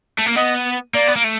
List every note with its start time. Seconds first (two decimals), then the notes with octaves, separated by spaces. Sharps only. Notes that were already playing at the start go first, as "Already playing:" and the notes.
0.19 A3
0.26 A#3
0.36 B3 D#5
0.94 A#3 D5
1.08 B3
1.16 A#3
1.24 A3